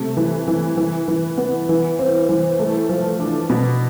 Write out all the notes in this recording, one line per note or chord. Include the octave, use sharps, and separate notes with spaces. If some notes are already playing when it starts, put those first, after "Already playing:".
Already playing: C3 A3
E3
E3
E3
E3
B3
E3
C4
E3
A3
F3
D4
B2